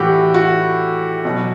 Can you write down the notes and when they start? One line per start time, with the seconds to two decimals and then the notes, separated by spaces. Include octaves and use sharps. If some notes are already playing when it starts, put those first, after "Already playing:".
Already playing: A2 E3 F#4 G4
0.34 F#4
1.25 B2 F#3